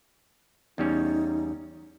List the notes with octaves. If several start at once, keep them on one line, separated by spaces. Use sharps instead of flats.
E2 G3 C#4 D#4